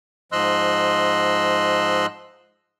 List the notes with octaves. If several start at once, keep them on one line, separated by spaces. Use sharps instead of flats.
G#2 F3 D#5 C6 E6 F#6